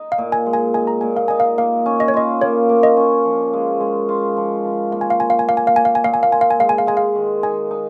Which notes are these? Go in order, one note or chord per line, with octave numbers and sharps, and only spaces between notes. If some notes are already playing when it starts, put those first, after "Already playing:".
Already playing: D#4
F5
A#2
G#5
G#3
G#5
D#4 G#5
A#5
A#2 G#5
F5
D#4 G#5
F5
A#3 F5
C#4
D#5
C#5
F4 D#5
A#3 C#5
A#3
D#5
C#4
F3
G#3
G#3
F4
F3
F3
A#3 F5
G#5
F5
F3 G#5
F5
G#5
A#3 F5
G#5
F5
A#3 G#5
F5
G#5
A#2 F5
G#5
F5
F4 G#5
F5
G#5
G#3 F5
G#5
F5
G#3 G#5
F5
D#3
D#4 G#5
D#4